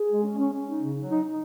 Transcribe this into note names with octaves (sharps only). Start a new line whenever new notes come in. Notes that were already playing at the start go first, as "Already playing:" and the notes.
Already playing: G#4
G#3
C#4
C#4
C#4
D#4
C#3
F#3
D#4
D#4